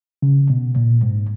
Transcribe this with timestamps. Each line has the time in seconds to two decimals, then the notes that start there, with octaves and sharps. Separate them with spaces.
0.22 C#3
0.50 B2
0.76 A#2
1.03 G#2